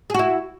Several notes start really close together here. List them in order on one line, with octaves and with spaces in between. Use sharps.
G#4 F#4 E4